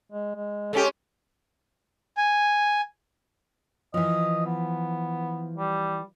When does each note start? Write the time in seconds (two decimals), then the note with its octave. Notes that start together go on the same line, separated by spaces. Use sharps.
0.12 G#3
0.35 G#3
0.73 G#3 C#4 G4 A4
2.17 G#5
3.94 E3 F3 D#5
4.46 B3
5.57 G3